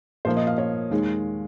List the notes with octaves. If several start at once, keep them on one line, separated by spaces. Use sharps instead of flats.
A#2 F3 A#3 C5
D#5
F5
C#5
D#2 D#3 G#3